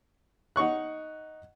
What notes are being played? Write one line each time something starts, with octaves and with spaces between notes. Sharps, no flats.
D#4 F#5 C#6 F#6